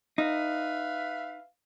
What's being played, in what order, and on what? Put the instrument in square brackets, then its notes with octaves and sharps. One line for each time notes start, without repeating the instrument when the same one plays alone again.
[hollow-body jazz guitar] D#4 [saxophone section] B4 E5 F5